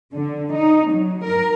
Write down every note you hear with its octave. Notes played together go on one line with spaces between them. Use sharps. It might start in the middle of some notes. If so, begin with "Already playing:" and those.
D3
D#4
F#3
A#4